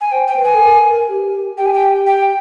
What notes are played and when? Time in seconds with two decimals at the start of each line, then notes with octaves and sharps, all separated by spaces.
0.01 G#5
0.12 C5 G5
0.28 G5
0.36 B4
0.45 G#5
0.54 A4
0.60 A#4
0.85 A#4
1.09 G4
1.58 G4 G5
1.66 G#5
1.74 G5
2.07 G5